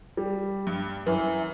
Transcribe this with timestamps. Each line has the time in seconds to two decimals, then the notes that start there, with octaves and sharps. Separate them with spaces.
0.17 G3
0.67 G2
1.06 F#2 E3 B4